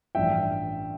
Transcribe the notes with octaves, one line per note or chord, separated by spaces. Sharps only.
A1 G2 F3 E5 G5